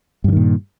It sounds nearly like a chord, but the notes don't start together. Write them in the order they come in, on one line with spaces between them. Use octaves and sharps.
G2 D3 D#3 A#2